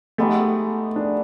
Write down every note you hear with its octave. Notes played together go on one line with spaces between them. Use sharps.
G#3 A3 B3 D#4 G4
D4